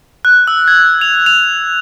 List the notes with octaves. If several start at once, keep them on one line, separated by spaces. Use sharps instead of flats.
F#6
E6
G#6
F7
F7